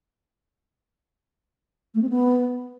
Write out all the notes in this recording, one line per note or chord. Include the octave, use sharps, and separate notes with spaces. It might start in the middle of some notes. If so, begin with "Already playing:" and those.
A3
C4
B3